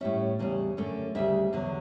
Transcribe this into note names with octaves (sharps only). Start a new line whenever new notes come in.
A2 G3 C#4 E5
E2 C#3 G3 C#4
F#2 D3 A3 C#4
D2 C#3 G3 E5
E2 D3 F#3